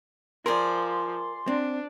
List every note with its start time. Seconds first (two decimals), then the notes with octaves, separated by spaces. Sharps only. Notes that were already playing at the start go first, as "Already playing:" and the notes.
0.46 F3 G#4 A#4 C5 D5 C6
1.48 C4 D4